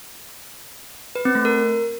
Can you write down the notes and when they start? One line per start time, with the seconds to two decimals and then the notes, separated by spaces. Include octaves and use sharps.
1.15 B4
1.25 C4
1.35 A3
1.45 A#4